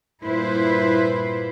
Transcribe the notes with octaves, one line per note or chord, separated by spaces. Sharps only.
G2 A#2 E4 B4 C5